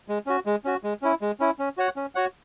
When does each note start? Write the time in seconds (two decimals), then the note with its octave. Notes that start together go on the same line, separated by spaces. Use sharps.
0.08 G#3
0.27 C#4 F#4
0.46 G#3
0.65 C#4 F#4
0.84 G#3
1.02 C#4 E4
1.21 G#3
1.40 C#4 E4
1.59 C#4
1.77 F#4 C#5 F#5
1.96 C#4
2.15 F#4 C#5 F#5